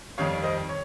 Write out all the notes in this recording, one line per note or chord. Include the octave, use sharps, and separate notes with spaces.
F2 D#3 G3 C#5 F5
C5 D#5
C#5